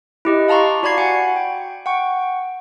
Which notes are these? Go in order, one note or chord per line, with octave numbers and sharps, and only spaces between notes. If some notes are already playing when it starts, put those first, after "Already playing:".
E4 G4 D#5
F5 A5 A#5 C6 C#6
F#4 D5 B5 G#6 C7
F#4 F#5 G#5 C#7
G5
F#5 G5 C#6